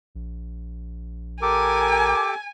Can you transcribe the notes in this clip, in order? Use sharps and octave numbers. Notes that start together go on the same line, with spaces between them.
A#1
G4 A4 A#4 G#5 D6